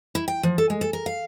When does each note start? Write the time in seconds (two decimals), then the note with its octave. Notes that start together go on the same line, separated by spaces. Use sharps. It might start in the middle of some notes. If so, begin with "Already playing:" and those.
0.15 E4
0.28 G5
0.43 F3
0.58 A4
0.70 G#3
0.81 A4
0.93 A#4
1.06 F5